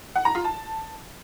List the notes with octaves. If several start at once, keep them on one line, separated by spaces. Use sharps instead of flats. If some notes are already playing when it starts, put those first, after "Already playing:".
F#5
A#5
F4
A5